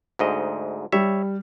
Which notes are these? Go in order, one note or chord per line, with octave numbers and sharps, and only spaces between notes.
D2 G#2 D#5
G3 C#5 E5